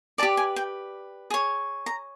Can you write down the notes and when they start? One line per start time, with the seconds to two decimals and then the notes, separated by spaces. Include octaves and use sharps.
0.18 G4 B4 D5 A5
0.37 G#5
0.56 G5
1.30 G#4 C#5
1.86 A#5